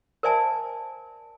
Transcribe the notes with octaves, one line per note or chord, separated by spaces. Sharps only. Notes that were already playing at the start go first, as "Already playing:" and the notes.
A#4 C5 D5 E5 G#5 A5